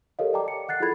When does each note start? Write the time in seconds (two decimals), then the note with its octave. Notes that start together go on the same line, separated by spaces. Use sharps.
0.19 G4 A4 A#4 C#5 D#5 F5
0.33 D5 D#5 G5 A5 A#5 D6
0.48 C#7
0.68 F#5 F#6 A6 C7
0.80 E4 F4 G#4 A4 B5 G#6